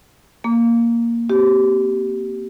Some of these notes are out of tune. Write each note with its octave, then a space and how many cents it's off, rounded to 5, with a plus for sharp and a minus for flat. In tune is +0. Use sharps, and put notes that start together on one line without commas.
A#3 +0 D6 -30
C4 -30 G4 -20